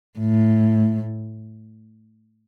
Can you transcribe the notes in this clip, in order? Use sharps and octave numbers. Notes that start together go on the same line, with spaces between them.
A2